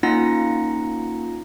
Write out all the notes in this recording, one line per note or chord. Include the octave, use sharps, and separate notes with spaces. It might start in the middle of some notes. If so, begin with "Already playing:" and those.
A#3 C#4 D#4 F4 F#5 A#6